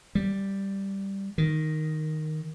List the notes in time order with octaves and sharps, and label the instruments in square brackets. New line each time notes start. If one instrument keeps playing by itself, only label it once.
[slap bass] G3
D#3